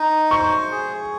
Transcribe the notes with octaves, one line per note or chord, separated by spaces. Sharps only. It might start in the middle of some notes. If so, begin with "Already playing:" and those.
Already playing: D#4
C5 C#6
G#4